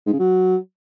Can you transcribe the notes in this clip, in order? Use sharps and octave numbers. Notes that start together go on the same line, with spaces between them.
G#2
C#3
F#3